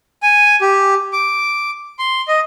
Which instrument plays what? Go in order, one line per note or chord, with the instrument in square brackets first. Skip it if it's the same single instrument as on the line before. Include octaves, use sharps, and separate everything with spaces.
[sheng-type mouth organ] G#5
G4
D6
C6
D#5